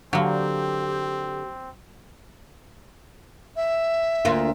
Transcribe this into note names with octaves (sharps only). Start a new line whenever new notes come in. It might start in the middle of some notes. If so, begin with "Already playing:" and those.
D3 F#3 A#3 C4 G4
E5
D2 A#3 F4